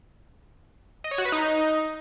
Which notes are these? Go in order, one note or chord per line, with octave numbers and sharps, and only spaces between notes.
D#5
C#5
F#4
B4
D#4